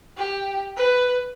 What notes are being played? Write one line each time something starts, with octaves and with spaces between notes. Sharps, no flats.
G4
B4